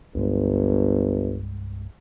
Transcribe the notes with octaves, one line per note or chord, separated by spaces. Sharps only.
G1 C2 G2 G#3